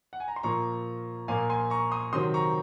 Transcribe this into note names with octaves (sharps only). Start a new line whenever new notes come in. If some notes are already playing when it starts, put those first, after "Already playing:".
F#5
G#5
A#5
C6
A#2 F3 A#3 A#5 C#6
A#2 F3 A#3 F5 G#5
G#5 C6
A#5 C#6
C6 D#6
C3 D#3 F#3 C4 C6 D#6
A#5 C#6